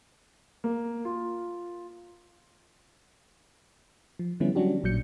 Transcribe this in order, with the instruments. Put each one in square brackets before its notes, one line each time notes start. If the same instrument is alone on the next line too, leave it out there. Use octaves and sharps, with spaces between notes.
[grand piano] A#3
F4
[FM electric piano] F3
D3 F3 G3 B3 C#4 E4
F#3 G3 C#4 D4 F#4 G4
A1 A#2 F#3 G6 C#7